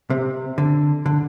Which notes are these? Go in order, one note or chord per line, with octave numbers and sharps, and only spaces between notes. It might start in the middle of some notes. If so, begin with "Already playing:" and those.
C3
D3
D3